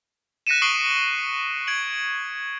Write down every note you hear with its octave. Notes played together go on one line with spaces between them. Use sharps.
F#6 A#6 B6 C#7 D#7 E7
C#6 D#6 C7 D7 F#7 G7
G#6 D7 F#7